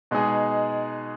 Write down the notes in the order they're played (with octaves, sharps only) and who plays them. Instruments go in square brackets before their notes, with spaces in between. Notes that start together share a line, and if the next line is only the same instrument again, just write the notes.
[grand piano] B2 G#3 D#4 G#4